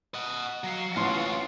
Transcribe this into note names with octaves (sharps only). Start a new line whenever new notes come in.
D#5 F#5
F#3 F5 F#5
A1 C#4 F4 C6